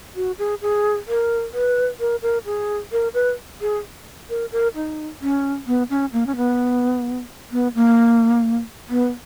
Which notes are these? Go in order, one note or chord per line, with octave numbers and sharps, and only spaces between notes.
F#4
G#4
G#4
A#4
B4
A#4
A#4
G#4
A#4
B4
G#4
A#4
A#4
D#4
C#4
B3
C#4
A#3
C#4
B3
B3
A#3
B3